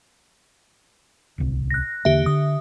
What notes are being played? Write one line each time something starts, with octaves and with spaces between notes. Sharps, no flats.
D1 C2 C4
F#6 A#6
E2 D3 A#3 G4 E5
D3 D#6